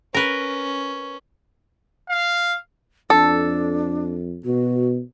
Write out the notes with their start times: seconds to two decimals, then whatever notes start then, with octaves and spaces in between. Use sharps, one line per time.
0.14 C#4 A#4 B4
2.09 F5
3.10 F2 D4 A4
4.45 B2 F#4